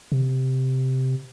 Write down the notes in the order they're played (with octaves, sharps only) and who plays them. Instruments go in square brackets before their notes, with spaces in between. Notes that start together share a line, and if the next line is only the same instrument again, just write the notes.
[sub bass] C3